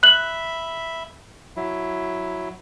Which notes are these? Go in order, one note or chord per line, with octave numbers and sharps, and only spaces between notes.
E5 B5 F#6 F#7
F#3 E4